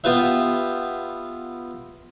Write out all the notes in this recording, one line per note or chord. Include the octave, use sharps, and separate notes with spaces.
B3 F4 G4 B4 E5